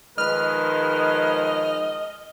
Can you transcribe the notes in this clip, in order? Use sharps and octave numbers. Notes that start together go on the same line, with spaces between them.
D#3 F3 G#3 B4 D#5 F6